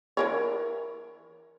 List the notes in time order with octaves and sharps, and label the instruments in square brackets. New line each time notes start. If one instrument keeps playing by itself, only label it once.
[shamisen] E3 A#4 C#5